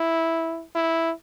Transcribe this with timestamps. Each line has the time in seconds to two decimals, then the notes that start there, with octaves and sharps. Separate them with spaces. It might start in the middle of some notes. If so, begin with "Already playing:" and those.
Already playing: E4
0.75 E4